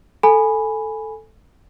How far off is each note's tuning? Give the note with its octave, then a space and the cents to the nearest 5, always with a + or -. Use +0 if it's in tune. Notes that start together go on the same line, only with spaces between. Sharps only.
A4 +0 G#5 +0 B5 +0